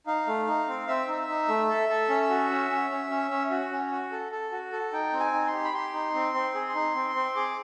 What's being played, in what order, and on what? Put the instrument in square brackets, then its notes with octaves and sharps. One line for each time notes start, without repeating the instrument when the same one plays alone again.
[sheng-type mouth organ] D#4 F5
A3
D#4
C4
C4 E5
D#4
D#4
A3
A4
A4
C#4
F#4
C#4
C#4
C#4
C#4
C#4
F#4
C#4
F#4
A4
A4
F#4
A4
D#4 G5
C4
G#5
D#4
C6
G4
B5
G4 C6
D#4
C4
C4
G#4
D#4
C4
C4
G#4 D6